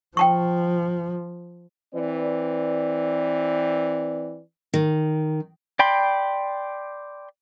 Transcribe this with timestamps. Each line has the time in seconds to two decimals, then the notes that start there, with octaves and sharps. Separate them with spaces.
0.17 F3 G5 A5 C#6
1.93 E3 C4 B4 D5
4.74 D#3
5.79 D5 G5 B5 C6